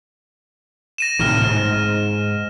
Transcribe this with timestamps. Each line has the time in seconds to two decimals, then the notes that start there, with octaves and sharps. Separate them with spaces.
0.98 A#6 D#7 E7
1.19 A2 C3 D#3 F6 D#7 E7
1.42 G#2